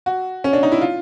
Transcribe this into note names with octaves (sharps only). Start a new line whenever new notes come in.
F#4
C#4
D4
D#4
E4
F4